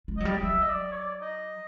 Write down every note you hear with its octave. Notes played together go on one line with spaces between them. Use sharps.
G#3
F#3 D#5
G3
F#3 E5
D#5
D5
C#5
D5
D#5